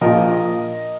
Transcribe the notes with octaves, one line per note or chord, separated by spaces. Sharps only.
A#1 A#2 F3 A#4 D#5